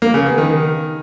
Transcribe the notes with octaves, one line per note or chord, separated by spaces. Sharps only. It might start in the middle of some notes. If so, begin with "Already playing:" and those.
A#3
C#3
B3
D#3